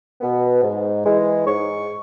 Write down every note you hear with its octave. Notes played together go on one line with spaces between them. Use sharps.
B2 B3
G#2
E3 G#3
G#2 C#6